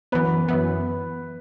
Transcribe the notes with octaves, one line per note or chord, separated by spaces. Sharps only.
F#2 E3 B3 B4
F#2 E3 B3